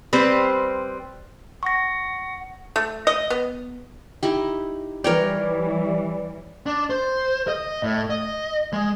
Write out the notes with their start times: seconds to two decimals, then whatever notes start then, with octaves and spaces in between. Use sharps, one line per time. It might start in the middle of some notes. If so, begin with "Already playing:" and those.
0.13 G3 C4 B4 C5
1.63 F#5 C#6 A#6
2.76 A3
3.07 D#5
3.30 B3
4.23 D#4 E4 G4
5.04 E3 G3 A#4 B4 C#5 D5 G5
6.66 D4
6.90 C5
7.48 D#5
7.83 A2
8.10 D#5
8.73 G#3